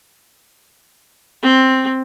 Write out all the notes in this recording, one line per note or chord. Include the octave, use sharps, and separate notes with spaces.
C4